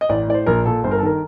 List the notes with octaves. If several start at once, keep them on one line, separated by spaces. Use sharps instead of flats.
D#5
A1 D5
A2 D5
C5
A#1 A#4
A#2 A4
G1 C5
A#4
A4
D#3 A#4